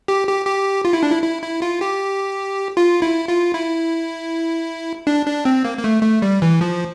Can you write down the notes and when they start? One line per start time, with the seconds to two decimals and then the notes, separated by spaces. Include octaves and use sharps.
0.08 G4
0.27 G4
0.46 G4
0.85 F4
0.93 E4
1.03 D4
1.11 E4
1.23 E4
1.42 E4
1.62 F4
1.81 G4
2.77 F4
3.02 E4
3.28 F4
3.54 E4
5.07 D4
5.26 D4
5.45 C4
5.64 A#3
5.78 A#3
5.84 A3
6.03 A3
6.22 G3
6.42 E3
6.61 F3